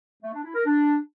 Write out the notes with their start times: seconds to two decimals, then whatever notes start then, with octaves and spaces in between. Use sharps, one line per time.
0.23 A3
0.33 D4
0.44 E4
0.55 A#4
0.65 D4